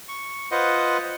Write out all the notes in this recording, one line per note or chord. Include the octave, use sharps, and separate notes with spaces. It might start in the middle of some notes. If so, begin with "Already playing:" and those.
C#6
F4 B4 C5 D#5 F#5